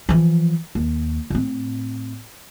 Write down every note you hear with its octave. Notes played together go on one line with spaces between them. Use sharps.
E3 F3
D#2
A2 C4